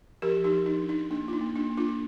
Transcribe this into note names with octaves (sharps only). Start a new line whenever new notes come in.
F3 G4 A#4
D#4 G4
F3
D#4
D4
D#4
A#3 D4
F4
D#4
A#3
D4
A#3
D4 F4